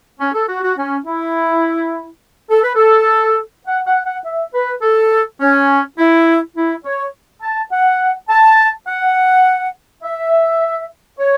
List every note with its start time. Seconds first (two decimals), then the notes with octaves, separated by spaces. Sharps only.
0.20 C#4
0.35 A4
0.49 F#4
0.64 F#4
0.78 C#4
1.06 E4
2.51 A4
2.64 B4
2.75 A4
3.67 F#5
3.86 F#5
4.05 F#5
4.25 E5
4.54 B4
4.82 A4
5.41 C#4
5.99 E4
6.57 E4
6.85 C#5
7.42 A5
7.72 F#5
8.29 A5
8.88 F#5
10.03 E5
11.19 C#5